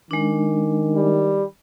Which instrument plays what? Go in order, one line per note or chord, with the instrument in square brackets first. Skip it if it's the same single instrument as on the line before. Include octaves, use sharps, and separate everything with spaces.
[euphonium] D#3 [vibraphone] G#3 D4
[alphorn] G3